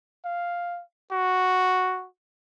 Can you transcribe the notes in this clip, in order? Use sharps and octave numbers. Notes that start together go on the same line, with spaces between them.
F5
F#4